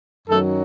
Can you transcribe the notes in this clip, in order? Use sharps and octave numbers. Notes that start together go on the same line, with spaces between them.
F#2 D#3 F#3 A4